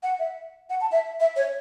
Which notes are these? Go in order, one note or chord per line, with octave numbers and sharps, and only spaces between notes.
F#5
E5
F#5
A5
E5
E5
C#5